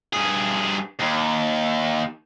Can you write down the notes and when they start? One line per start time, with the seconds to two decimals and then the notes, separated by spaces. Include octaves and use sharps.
0.13 G2 G#4
1.00 D#2